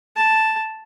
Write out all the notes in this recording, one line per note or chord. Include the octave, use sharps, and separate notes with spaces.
A5